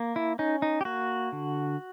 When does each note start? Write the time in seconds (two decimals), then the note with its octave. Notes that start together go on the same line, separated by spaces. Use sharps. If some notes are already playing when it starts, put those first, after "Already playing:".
Already playing: A#3
0.16 E4
0.39 C#4 D#4
0.62 D#4
0.81 G4
0.85 A#3 F#4
1.32 D3